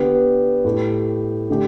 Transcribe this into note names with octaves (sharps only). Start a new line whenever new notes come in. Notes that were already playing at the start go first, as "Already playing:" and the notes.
Already playing: D3 B3 G4 B4
A2 A3 G4
D3 A3 G4